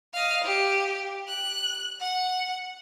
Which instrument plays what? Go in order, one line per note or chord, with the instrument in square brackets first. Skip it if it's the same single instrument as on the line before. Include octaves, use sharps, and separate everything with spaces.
[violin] D#5 F5
G4
F#6
F#5